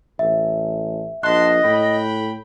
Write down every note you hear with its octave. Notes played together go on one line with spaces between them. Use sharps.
A1 E5
A#1 D#5 F#5 A5 C6 F#6
A2 G5 B5